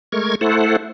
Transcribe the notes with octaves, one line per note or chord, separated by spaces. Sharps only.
G#3 A3 A#4 C#6 G#6
A3 E4 A4 C5 F#5